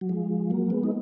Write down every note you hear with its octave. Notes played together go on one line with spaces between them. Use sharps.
F#3
F3 G#3
F#3 A#3
G#3 B3
D#4